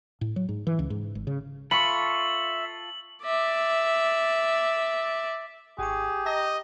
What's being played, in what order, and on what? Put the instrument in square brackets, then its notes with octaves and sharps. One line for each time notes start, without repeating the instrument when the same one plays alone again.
[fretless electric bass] A2
F#3
G#2
E3
C#2
G#2
G#1
C#3
[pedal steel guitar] F4 A4 [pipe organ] E5 [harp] B5 C#6 [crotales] F#7
[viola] D5 E5
[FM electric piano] G#1 C#6 [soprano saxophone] G4 [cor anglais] G#4
[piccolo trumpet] D#5 [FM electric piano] A5 A#5 A#6